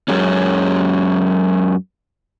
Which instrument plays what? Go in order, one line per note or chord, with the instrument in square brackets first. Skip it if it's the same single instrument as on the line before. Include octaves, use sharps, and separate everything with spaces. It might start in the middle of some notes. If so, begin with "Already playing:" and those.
[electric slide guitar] F#2 F#3 G#3 C#4